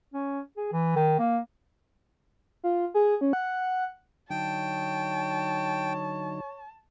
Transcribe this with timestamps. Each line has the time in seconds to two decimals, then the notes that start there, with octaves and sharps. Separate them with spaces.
0.14 C#4
0.57 G#4
0.72 E3
0.96 D#3
1.19 A#3
2.64 F4
2.94 G#4
3.21 C#4
3.33 F#5
4.30 D3 F#3 D#4 C#5 G5 A5